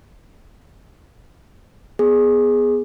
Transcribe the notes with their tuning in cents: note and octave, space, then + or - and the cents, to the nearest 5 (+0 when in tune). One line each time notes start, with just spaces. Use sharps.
B3 +0 G#4 +0